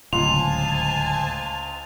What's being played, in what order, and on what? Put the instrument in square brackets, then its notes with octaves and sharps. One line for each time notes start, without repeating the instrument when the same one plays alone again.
[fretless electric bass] D1 [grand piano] C#2 C6 [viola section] C5 G#5 A5 [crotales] F7